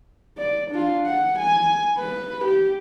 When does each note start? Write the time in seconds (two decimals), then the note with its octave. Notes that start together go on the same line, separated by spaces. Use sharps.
0.38 D5
0.71 D4 F4
1.06 F#5
1.39 G#5
1.98 B4 B5
2.45 G4